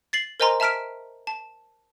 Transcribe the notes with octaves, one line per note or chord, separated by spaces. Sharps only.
A6 C7 F#7
A#4 C5 D#5 G#5 A#5 C6
E5 A5 A#5 F6 B6 D7
A5